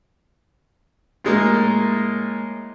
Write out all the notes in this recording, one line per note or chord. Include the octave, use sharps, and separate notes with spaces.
A2 G#3 A#3